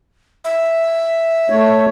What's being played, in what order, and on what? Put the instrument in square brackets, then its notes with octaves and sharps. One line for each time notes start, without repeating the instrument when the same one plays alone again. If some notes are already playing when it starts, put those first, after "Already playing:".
[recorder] E5
[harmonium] A3 C#5